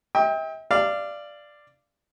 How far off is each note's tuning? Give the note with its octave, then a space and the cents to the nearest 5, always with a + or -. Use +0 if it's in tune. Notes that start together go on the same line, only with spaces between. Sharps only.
E5 -45 G5 +20
D5 +5 F5 -25